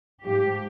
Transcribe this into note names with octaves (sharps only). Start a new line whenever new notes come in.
G#2 F3 G4